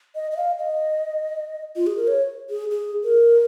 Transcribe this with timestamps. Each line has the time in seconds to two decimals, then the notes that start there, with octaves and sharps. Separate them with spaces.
0.15 D#5
0.31 D#5
0.37 F5
0.59 D#5
1.76 F4
1.87 G#4
1.97 A#4
2.07 C#5
2.50 G#4
2.71 G#4
3.04 A#4